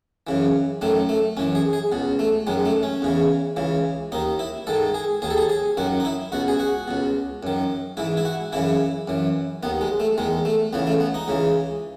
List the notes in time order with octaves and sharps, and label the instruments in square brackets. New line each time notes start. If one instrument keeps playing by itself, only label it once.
[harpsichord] F#2 C#3 E3
F#2 D#3 A3
A3
F#2 E3 C#4
G#4
G#4
C#2 B2
A3
F#2 D#3 G#3
A3
C#4
E2 C#3 E3
C#2 C#3 E3
D#2 D#3 D#4
E4
G#2 D#3 A4
G#4
D#2 D#3 G#4
A4
G#4
G#4
F#2 D#3 F#4
D#4
E4
C#2 B2 F#4
G#4
F#4
C#2 B2
F#2 D#3
G#2 E3 E4
E4
F#4
F#2 C#3 E3 E4
F#2 E3
D#2 D#3 B3
G#3
A3
E2 D#3 G#3
A3
C#2 C#3 E3 B3
A3
B3
D#4
C#2 C#3 E3